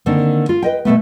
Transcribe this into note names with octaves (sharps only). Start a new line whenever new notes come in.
D3 D#3 A#3 C4
F4
B4 D#5 G5
B2 D#3 A3 B3